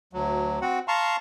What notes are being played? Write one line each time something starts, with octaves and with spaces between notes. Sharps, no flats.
D2 F#3
C4 F#4 F#5
F5 A5 A#5 C6 C#6